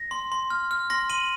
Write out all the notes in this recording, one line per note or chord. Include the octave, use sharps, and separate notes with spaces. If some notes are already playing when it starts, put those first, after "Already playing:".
Already playing: A#6
C6
C6
F6
F6
C6 A#6
C6 D#7 F#7